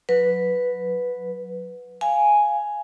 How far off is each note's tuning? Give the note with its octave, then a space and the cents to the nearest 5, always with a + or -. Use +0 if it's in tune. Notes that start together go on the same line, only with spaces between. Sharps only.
F#3 -25 B4 +0
F5 -10 G#5 +0